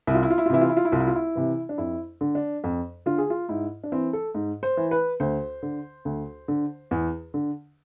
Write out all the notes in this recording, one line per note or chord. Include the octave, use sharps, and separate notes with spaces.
C2 E4
F4
E4
F4
E4
F4
C3 E3 E4
F4
E4
F4
E4
C2 F4
E4
F4
E4
C3 E3
D4
F2 E4
D3
D4
F2
D3 F4
G#4
F4
G#2 E4
D4
E3 C4
A4
G#2
C5
E3
B4
D2 C5
D3
D2
D3
E2
D3